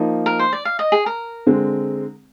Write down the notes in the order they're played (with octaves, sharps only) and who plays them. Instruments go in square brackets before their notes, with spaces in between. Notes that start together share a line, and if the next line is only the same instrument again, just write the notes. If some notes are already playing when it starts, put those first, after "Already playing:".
Already playing: [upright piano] F3 A#3 D#4
[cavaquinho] A#4
C5
D5
F5
D#5
G#4
A#4
[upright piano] D3 G#3 C4